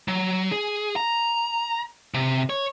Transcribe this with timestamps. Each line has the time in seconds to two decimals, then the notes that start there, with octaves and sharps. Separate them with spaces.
0.08 F#3
0.52 G#4
0.96 A#5
2.14 C3
2.50 C#5